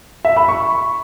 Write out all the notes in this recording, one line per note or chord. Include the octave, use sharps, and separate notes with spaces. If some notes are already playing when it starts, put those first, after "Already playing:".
E5
B5
C#6